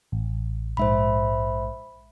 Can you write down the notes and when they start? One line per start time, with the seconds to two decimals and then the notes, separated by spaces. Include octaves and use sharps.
0.12 A1
0.77 A#1 G#2 C5 E5 B5